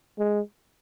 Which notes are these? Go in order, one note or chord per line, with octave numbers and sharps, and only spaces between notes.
G#3